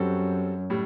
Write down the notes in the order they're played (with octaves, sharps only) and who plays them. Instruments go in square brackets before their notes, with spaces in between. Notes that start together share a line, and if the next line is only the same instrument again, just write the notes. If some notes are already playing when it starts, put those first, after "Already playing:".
Already playing: [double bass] F#2 [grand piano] G3 C4 F#4 A4
[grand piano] A2 G3